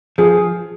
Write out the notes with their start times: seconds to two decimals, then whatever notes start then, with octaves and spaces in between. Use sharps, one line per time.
0.18 F3 G#4